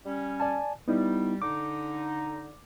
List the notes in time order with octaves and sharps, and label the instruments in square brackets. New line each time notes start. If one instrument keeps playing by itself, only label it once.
[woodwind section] G3 C#4
[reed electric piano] D5 G#5 A5
[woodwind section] G3 [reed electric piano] B3 D#4 E4
[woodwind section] D3 D#4 [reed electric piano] D6